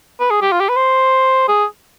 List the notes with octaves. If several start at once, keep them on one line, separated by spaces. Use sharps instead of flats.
B4
G#4
G4
F4
G4
B4
C5
G#4